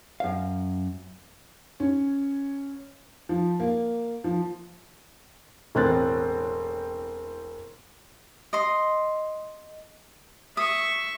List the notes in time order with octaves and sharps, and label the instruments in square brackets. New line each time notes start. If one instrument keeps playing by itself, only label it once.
[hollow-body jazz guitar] F#2 F5
[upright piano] C#4
F3
A#3
F3
[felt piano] E1 A2 C4 F#6 A6
[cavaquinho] D#5 C6
[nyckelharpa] E5 C#6 [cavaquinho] D#6